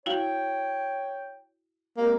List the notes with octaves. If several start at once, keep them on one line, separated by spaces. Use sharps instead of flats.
E4 F#4 C#5 F5 G5
G#3 A#3 C4 G4